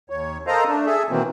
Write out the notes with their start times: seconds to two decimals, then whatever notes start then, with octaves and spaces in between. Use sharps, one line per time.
0.10 D#2 C#5
0.47 A4 A#4 C5 D#5 F5 A#5
0.67 A3 D4
0.86 G#4 A4 E5
1.10 B2 D#3 E3 F#3 A#3 C4